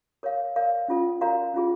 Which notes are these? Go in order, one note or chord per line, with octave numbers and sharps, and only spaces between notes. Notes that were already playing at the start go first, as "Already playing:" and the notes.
A#4 C#5 F5
A#4 D5 F5
C#4 F4 A4
F#4 A#4 D5 F5 A#5
C#4 F4 G#4